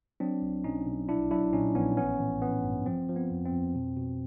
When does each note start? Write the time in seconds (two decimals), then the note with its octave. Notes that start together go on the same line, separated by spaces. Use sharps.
0.20 F#3 C4 D4
0.42 B1
0.64 B1 C#4 D#4
0.86 B1
1.09 A#1 D4 E4
1.31 F#3 D4 E4
1.53 A#2 C#4 D#4
1.75 A#1 B3 C#4
1.97 A1 B3 C#4
2.20 A1
2.42 A1 B3
2.64 G2
2.86 F3 C4
3.09 F3
3.16 B3
3.31 F2
3.45 C4
3.53 F2
3.75 B2
3.97 B2